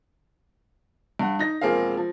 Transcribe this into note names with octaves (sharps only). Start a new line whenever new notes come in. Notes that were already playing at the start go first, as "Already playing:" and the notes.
G2 F#5
D#4 A#6
E1 F3 A#3 C4 G#4 F5
F3